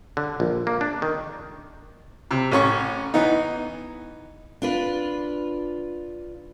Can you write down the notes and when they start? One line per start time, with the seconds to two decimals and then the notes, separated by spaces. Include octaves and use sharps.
0.17 D3
0.40 A#1
0.67 A#3
0.81 D4
1.02 D#3
2.31 C3
2.52 A1 C#4 C#6
3.14 E3 B3 D#4
4.62 D4 F4 B4